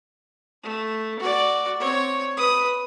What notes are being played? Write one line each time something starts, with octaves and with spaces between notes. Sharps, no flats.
A3
F#4 D5
C4 C#5
B4 D#6